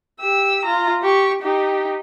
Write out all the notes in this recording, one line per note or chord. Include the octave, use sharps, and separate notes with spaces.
G4 E6
F4 A#5
G4 C#6
D#4 G4